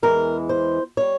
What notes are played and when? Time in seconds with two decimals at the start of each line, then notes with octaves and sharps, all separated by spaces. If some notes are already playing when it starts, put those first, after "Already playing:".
0.02 E2 E3 G#3 A#4
0.49 C5
0.97 G3 C#5